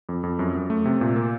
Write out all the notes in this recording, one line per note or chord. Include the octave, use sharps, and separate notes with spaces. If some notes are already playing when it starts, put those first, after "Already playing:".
F2
F2
F#2
F#2
A3
C3
A#2
A#3